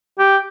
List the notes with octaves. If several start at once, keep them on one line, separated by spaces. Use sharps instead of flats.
G4